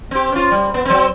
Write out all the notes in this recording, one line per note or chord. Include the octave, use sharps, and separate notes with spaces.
C4 G4
C#4 F4
G3
B3
F#3 C4